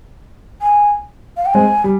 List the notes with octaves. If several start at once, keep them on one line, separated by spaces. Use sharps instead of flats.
G#5
F5
G5
G#3 C4 G#5
G3